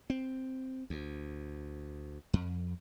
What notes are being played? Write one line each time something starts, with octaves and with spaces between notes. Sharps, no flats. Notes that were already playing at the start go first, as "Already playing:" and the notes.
C4
D2
F2